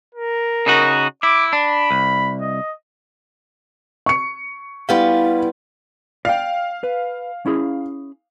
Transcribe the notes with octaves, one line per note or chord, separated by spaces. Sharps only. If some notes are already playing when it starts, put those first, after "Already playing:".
A#4
C#3 D#4 F#4
E4 D6
D4 B5
C2
D#5
C#6 C#7
G3 B3 E4 F4 F5
D5 F5 G5
B4
C#4 E4 G#4